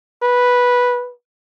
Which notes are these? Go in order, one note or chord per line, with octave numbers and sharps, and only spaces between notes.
B4